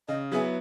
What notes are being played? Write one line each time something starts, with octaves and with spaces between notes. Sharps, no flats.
C#3 D#5
F#3 B3 E4 G#4